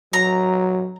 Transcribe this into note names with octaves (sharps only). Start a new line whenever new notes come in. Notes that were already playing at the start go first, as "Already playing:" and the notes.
F#3 A#5